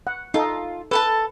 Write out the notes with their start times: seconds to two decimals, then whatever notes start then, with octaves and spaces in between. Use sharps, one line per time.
0.07 F#5
0.34 D#4 F4 A4
0.91 A4 B4 G#5 A5